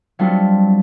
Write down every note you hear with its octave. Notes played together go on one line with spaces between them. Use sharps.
F#3 G3 A3 C4 D4 F4